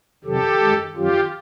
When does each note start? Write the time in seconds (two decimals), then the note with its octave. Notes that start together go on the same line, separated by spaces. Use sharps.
0.24 F2 C3 D#3 F#3 G4 A4
0.59 F#2 D#3 G#3
0.95 F#2 D#3 F#3 F4 G4